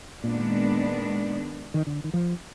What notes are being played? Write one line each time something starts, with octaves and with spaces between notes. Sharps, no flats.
A#2 D#3 G#3 B3 D4
D#3
D3
D#3
F3